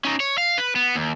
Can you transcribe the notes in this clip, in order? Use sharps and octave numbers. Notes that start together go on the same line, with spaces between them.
C#4 D#4
C#5
F5
B4
B3
D#2